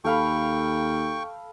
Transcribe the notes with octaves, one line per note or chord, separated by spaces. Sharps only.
D#2 A4 F5 G5 B5 C#6